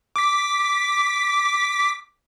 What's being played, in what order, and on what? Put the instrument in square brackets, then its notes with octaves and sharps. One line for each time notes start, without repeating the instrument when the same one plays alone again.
[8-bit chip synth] D6 B6